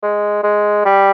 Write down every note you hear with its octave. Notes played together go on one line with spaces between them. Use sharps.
G#3
G#3
G3